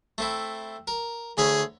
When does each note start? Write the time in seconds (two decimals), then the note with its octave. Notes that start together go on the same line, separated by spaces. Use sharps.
0.18 A3 C4 E4
0.87 A#4
1.38 D2 G#4 C#5 B5